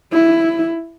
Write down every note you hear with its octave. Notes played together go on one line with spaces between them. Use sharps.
E4